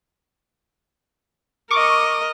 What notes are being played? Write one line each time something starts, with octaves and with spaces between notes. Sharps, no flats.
A#4 D#5 C#6 D6